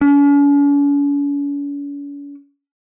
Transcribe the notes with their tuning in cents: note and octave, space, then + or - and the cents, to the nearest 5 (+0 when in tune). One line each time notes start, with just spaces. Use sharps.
C#4 +45